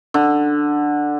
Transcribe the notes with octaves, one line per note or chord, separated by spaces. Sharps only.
D3